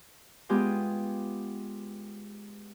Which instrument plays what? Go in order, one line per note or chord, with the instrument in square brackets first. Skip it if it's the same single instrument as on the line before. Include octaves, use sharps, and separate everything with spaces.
[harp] G#3 B3 F4 G4 G#4